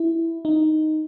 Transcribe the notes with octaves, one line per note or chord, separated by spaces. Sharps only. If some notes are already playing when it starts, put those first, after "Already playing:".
Already playing: E4
D#4